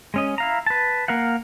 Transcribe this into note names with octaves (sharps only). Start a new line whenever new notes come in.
G#3 C#4 D#5
E4 F5 A#5
B4 A5
A#3 A#4 F5 F#5